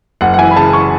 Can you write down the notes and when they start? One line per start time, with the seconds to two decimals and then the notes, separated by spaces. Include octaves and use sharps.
0.21 F#1 F#5
0.34 F#5
0.38 E3 G#5
0.51 B5
0.56 C#3 A5
0.73 C#6